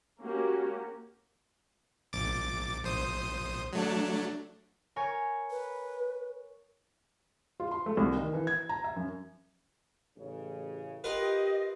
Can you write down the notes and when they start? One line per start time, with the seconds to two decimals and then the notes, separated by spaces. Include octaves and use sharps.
0.22 A#3 C#4 F#4 G4
2.13 A#1 D6 A6
2.84 A#1 C5 D#6
3.73 F#3 A3 D4
4.96 A#4 C#5 G#5
5.51 B4
7.60 F4
7.71 C6
7.86 A3
7.97 C2
8.16 D#3
8.34 E3
8.47 G#6
8.69 A#5
8.84 E5
8.96 F#2
10.17 A1 C#3
11.04 F4 G4 A#4 B4 D#5